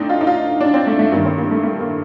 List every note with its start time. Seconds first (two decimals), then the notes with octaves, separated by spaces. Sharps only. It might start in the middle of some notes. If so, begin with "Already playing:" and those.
Already playing: A3 C4 D4 D#4
0.09 F4
0.21 D#4
0.27 F4
0.61 D4
0.74 C4
0.87 A3
0.99 A3
1.12 G2 D#3 A#3
1.25 C4
1.38 A#3
1.51 A3
1.63 A3
1.81 A#3